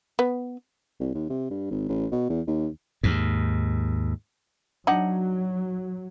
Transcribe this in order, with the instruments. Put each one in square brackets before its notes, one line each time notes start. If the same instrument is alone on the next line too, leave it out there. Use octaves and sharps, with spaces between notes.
[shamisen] B3
[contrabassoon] C2
D#2
C3
G2
G#1
A1
B2
E2
D#2
[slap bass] D#2 G#2
[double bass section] F#3 [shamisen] D4 D#4 F#5